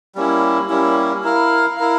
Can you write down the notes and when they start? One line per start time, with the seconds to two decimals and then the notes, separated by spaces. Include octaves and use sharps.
0.15 G3 A#3 C#4 E4
0.69 G3 A#3 C#4 E4
1.23 E4 A#4 F5
1.76 E4 A#4 F5